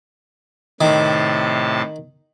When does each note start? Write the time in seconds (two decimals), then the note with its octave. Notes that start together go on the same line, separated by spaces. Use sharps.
0.81 A2 C3 D#3 A5